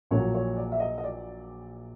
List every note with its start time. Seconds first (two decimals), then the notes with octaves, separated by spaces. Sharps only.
0.11 A#1 A#2 F#3 C#5
0.34 C#5
0.57 D5
0.72 E5
0.80 D#5
0.98 D#5
1.04 D5